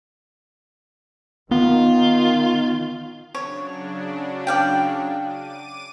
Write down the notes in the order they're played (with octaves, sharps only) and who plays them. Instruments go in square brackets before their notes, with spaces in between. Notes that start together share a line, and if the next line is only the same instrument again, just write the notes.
[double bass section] D#3 [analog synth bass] B3 [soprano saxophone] F4
[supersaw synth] C#3 F#3 D4 [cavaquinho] C#5
[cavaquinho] D5 F5 G5
[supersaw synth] D6 D#7